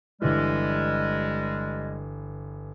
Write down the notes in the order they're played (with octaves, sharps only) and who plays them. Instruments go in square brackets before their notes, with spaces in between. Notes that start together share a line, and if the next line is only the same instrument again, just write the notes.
[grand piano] G1 E3 [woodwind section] G3 G#3